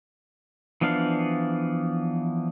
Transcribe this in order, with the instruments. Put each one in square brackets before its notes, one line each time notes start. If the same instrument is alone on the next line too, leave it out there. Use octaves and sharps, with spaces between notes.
[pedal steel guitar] E3 F3 B3 D4 F5